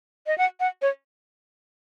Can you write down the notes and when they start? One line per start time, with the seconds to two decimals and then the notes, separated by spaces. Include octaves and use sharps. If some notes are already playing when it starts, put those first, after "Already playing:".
0.27 D#5
0.38 F#5
0.60 F#5
0.82 C#5